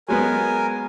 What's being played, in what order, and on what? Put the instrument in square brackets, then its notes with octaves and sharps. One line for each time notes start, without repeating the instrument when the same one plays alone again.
[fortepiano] F#3 G#3 B3 [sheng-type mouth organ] A#4 G#5